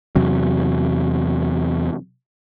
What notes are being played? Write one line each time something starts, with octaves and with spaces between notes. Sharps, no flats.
E2 C3 F#3